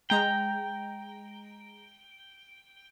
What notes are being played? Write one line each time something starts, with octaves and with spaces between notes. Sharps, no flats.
G#3 G5 A#5